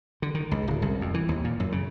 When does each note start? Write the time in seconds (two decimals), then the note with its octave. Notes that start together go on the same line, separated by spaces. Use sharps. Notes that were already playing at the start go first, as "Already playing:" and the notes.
0.22 D3
0.35 D#3
0.51 C#2
0.68 D1
0.82 C2
1.01 F2
1.14 E3
1.29 D#2
1.44 A#2
1.60 F#2
1.72 C#3